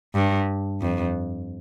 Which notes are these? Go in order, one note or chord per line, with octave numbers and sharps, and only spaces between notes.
G2
F2